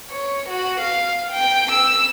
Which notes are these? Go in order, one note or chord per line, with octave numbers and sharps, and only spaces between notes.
C#5
F#4
F5
G5
E6